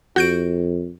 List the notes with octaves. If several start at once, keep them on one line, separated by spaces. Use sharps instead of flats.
F2 F#4 G6 D7